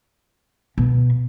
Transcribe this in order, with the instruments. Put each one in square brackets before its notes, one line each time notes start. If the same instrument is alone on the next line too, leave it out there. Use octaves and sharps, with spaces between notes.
[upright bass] B2